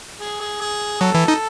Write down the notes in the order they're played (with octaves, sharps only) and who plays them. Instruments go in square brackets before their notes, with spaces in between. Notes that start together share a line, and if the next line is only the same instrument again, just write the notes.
[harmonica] G#4
G#4
G#4
[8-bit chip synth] F#3 [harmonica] A4
[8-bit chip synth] E3
D#4